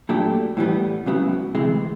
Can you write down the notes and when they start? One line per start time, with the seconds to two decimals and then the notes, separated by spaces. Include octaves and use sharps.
0.09 A#2 F#3 A3 D4 G4
0.57 A2 E3 G3 B3
1.06 C#2 C#3 F#3 B3 E4
1.55 D2 C3 E3 G#3